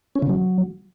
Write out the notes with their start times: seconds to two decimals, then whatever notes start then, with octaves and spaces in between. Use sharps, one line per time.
0.15 C#4
0.22 C#3
0.29 F#3